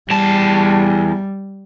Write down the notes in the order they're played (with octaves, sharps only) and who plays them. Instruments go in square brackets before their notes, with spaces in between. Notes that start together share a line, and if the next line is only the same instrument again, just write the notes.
[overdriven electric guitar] E2 A5 [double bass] G3